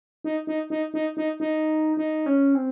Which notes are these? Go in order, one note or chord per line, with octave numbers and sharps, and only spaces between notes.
D#4
D#4
D#4
D#4
D#4
D#4
D#4
C#4
C4